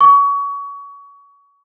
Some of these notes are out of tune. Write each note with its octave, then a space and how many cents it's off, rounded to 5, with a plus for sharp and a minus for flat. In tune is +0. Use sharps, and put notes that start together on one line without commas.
C#6 +30